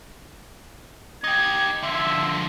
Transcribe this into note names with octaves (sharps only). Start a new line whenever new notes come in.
D#4 G4 G#6
D3 F3 E5